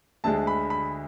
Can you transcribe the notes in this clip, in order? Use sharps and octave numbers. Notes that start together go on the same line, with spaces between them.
D2 D3 G#3 A5
B5
B5